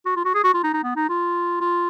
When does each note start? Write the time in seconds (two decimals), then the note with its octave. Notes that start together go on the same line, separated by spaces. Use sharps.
0.06 F#4
0.16 F4
0.25 F#4
0.35 G#4
0.44 F#4
0.54 F4
0.64 D#4
0.74 D#4
0.83 B3
0.96 D#4
1.09 F4
1.61 F4